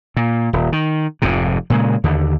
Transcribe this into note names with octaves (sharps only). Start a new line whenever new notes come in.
A#2
D#1
D#3
F1 F2 G#2 C3
A#2 C#3 G#3
D#2 D3